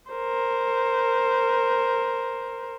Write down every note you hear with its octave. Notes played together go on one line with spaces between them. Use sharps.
A#4 C5